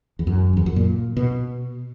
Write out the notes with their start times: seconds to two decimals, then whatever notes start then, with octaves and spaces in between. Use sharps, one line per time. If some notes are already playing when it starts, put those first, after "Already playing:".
0.19 E2
0.27 F#2
0.57 E2
0.66 F#2
0.76 A#2
1.17 B2